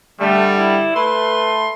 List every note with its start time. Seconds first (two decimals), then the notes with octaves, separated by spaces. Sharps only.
0.20 D3 G3 A3
0.57 E4
0.96 A3 B4 C6